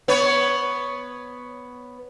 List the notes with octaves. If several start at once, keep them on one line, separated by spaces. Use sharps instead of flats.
B3 B4 C#5